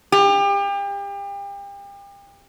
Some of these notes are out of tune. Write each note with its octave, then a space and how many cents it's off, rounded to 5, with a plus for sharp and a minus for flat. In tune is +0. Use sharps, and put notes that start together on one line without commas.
G4 +35